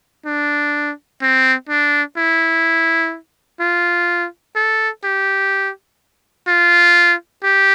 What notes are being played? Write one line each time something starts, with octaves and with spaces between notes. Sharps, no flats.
D4
C4
D4
E4
F4
A4
G4
F4
G4